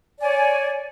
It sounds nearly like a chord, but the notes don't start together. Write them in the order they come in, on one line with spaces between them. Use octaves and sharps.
D5 G#5 C#5